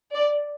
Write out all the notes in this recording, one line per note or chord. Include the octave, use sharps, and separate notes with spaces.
D5